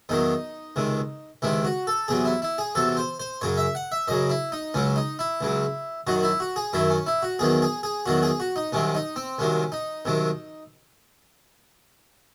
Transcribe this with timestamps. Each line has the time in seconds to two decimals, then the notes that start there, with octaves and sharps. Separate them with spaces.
0.09 E2 D#3 F#3 D#4
0.76 C#2 C3 D#3
1.42 C#2 C3 D#3 E4
1.65 F#4
1.87 A4
2.08 E2 C3 F#3 G#4
2.25 E4
2.42 E4
2.58 G#4
2.75 E2 C3 F#3 A4
2.97 C5
3.20 C5
3.41 F#2 C#3 F#3 C#5
3.57 E5
3.75 F#5
3.92 E5
4.08 F#2 C#3 F#3 D#5
4.30 E4
4.52 D#4
4.74 C#2 C#3 F#3 C#4
4.96 D#4
5.19 E4
5.41 C#2 C#3 F#3
6.07 F#2 D#3 F#3 F#4
6.23 E4
6.40 F#4
6.56 G#4
6.73 F#2 D#3 F#3 E4
6.90 C#4
7.06 E4
7.22 F#4
7.39 E2 D#3 F#3 G#4
7.62 G#4
7.83 G#4
8.06 E2 D#3 F#3 F#4
8.23 G#4
8.40 F#4
8.56 D#4
8.72 C2 C3 D#3 F#3 C#4
8.95 D#4
9.16 C4
9.39 C2 C3 D#3 F#3 C#4
9.72 D#4
10.05 C2 C3 D#3 F#3